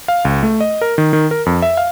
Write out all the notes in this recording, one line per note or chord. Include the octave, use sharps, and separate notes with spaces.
F5
C#2
A3
D#5
A#4
D#3
D#3
A#4
F2
E5
F5